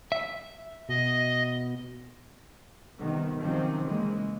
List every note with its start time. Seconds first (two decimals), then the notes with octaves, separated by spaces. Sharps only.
0.12 E5
0.89 B2 D#5
2.98 C3 D#3 G3 B3
3.40 C3 D#3 F3 F#3 C4 C#4
3.85 C#3 E3 G#3 A#3